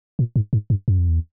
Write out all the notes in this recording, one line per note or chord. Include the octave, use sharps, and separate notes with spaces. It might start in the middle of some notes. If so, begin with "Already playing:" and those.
A#2
G#2
G#2
G2
F#2
F2
E2